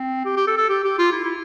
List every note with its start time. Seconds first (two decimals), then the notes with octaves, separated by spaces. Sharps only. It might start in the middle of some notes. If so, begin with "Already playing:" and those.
Already playing: C4
0.25 G4
0.37 G4
0.47 A4
0.58 A4
0.69 G4
0.84 G4
0.99 F4
1.12 E4
1.24 E4